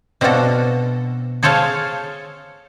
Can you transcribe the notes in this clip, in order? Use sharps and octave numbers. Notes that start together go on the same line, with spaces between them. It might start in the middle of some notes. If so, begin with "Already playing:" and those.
B2 C4 D4 F4 F#4 A4
G#4 A4 C5 C#5 F5 A5